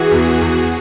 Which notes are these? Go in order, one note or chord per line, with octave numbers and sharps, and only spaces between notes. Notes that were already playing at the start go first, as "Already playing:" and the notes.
Already playing: E3 F#4 G#4
E2
E2